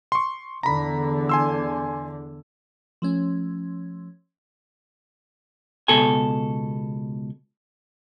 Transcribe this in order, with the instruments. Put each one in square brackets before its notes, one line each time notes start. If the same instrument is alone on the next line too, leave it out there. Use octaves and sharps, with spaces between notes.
[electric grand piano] C6 C#6
[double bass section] E2 D3 [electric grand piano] A#5 B5
[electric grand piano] G#5 C6 E6
[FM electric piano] F3 A3 C#4
[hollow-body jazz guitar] C#2 B2 A4 G#5